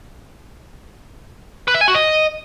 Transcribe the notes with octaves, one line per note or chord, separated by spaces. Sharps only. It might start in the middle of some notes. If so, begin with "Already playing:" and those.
B4
E5
G#5
F#4
D#5